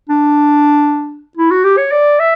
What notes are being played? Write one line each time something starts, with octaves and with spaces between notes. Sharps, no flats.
D4
E4
F#4
G4
C#5
D5
E5